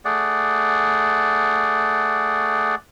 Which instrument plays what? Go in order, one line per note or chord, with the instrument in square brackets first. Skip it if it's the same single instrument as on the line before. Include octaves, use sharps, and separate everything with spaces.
[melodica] A3 G#4 D5 F#5